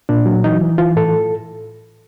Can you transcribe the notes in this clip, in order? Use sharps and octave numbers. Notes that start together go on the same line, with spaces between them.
A#2 D4
F#3
E3 D#4
E3
E3 F4
A2 A4